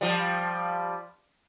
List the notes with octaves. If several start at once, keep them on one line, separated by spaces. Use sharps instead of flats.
F3 G3